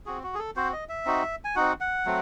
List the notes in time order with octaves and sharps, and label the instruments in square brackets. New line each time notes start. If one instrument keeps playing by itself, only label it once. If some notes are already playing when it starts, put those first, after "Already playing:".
[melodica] C4 F#4 G#4
F#4
G#4
A4
C4 F#4 C5
D#5
E5
C4 D#4 F#4
G#5
C4 D#4 F#4 F#5
F#5
F#3 A3 C4